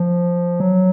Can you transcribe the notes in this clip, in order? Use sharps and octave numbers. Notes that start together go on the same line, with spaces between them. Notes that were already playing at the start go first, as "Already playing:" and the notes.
Already playing: F3
F#3